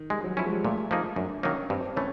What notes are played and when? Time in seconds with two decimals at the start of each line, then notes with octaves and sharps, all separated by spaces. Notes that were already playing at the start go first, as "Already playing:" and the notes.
Already playing: D#3
0.10 G3 G#3
0.24 F#3
0.37 F3 C#4 E4
0.45 G#3
0.51 G3
0.65 A#2 A3
0.91 F3 A#3 D#4 G#4
1.16 F#2 D4
1.43 D#3 F#3 A#3 C#4 D#4
1.70 G2 C4
1.96 E3 A3 C#4